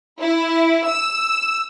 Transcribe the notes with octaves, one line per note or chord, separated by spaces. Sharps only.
E4
E6